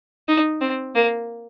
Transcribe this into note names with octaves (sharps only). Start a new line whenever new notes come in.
D#4
C4
A#3